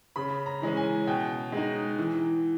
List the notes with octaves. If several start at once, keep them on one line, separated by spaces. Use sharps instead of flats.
C#3 B5
A#5
E3 G#3 C#4
G#5
B2 G5
G#3 D#4
E3